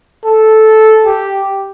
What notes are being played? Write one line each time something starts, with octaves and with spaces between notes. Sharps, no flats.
A4
G4